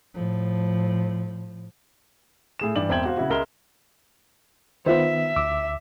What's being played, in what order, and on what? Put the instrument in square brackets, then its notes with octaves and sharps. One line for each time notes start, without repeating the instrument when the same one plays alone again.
[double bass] A2 F3
[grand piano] A2 G#4 E7
G2 E3 D5 F#7
E1 C4 E5 G5 G#6 F#7
F#4 C5 F5
C#3 E4 F#4
C#2 G#3 A#4 E5 G7
[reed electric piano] D#3 B3 [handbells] F4 C5 [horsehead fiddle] E5
[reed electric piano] D2 D6 E6